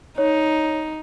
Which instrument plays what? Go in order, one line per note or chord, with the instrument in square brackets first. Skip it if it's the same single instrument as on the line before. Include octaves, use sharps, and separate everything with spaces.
[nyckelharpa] D#4 [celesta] C#5